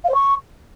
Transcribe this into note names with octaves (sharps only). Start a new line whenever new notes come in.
F5
C5
C#6